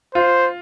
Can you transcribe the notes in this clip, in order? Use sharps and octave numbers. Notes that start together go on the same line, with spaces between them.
F4 C5